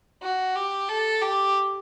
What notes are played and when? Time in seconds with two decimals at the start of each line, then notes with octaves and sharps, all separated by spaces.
0.23 F#4
0.56 G4
0.89 A4
1.21 G4